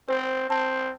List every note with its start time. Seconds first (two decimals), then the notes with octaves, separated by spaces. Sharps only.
0.09 C4 C5
0.50 C4 A5